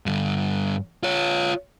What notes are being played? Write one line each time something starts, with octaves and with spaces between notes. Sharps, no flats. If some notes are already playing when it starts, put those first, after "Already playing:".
G2 D3
F4 C#5